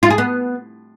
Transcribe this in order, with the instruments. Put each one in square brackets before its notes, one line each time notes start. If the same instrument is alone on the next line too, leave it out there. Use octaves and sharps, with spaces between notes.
[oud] F4
G#4
B3